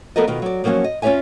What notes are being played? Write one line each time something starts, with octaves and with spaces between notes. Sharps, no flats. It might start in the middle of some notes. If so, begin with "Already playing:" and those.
F3 B3 A4 A#4 D5 D#5
B2 D#3 F4
F#3 D5
F3 F#3 A#3 C#4 F#4
D#5
C#4 F4 G4 C#5 E5 G#5